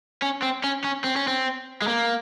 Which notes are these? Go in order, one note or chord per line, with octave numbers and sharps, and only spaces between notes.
C#4
C4
C#4
C#4
C4
C#4
C4
G#3
A#3